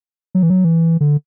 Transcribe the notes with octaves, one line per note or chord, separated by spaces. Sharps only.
F#3
E3
F#3
E3
D3